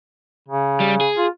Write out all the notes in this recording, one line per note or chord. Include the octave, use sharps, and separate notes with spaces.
C#3
G3
G#4
F4